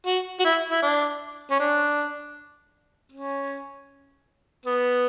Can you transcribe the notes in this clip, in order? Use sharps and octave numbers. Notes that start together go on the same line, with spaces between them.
F#4
F#4
E4
E4
D4
C#4
D4
C#4
B3